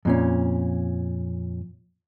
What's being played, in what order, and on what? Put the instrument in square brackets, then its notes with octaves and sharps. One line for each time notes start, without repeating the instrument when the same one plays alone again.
[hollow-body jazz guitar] F2 A#2 C#4